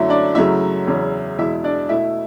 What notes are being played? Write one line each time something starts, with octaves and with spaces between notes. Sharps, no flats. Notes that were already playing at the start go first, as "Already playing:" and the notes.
Already playing: F#2 D3 F#3 A3 E4 E5
D4 D5
F#2 C#3 F#3 A3 E4 E5
E2 C#3 F#3
E2 B2 G#3 E4 E5
D4 D5
B2 A3 E4 E5